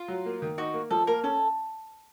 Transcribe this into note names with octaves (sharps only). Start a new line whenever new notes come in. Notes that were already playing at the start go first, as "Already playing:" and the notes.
Already playing: F4
F#3
A#3
D#3
D#4 F#4
A#3
F3 A4
A#3 A#4
C#4 A4